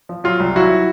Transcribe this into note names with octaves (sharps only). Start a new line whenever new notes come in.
F3
F#3 F4
C2
F#3 E4 F#4